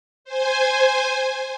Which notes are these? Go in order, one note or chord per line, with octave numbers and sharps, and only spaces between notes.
C5 G#5